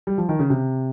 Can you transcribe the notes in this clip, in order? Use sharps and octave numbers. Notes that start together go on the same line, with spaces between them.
G3
F3
D#3
C#3
C3